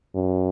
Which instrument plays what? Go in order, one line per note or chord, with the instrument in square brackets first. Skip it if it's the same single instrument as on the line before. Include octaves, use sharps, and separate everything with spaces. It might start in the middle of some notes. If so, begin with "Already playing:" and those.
[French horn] F#2